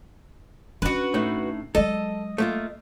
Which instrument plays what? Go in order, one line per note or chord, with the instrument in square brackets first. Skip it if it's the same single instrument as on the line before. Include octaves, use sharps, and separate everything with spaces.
[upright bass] C#4 D4 [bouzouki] F#4 B4
[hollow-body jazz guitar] A2 A3 D#4
[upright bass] F#3 G#3 [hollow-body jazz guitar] A4 [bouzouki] D#5
[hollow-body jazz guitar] A3 A#3 F4